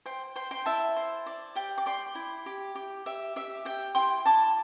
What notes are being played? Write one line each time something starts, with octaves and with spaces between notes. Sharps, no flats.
C5 G5
C5 G5 C6
G5 C6
E4 E5 A5
C5
D5
G4 G5
D6
D5 G5 C6
E4
G4
G4
G4 E5
G4 E5
G4 G5
E4 G5 C6
E4 A5 D6